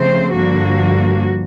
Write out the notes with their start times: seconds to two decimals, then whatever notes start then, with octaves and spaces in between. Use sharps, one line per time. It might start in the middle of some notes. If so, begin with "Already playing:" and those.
Already playing: C#3 F3 A3 C4 C5
0.32 G2 D3 F3 A#3 F#4